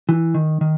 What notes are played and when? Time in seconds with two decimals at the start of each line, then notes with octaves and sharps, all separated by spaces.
0.09 E3
0.34 D#3
0.61 D#3